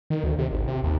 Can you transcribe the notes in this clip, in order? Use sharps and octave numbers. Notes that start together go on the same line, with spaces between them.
D#3
D2
C3
G#1
C3
D#2